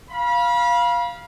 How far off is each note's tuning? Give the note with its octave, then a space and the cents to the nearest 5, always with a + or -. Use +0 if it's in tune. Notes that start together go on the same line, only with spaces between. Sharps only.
F5 +0 B5 -30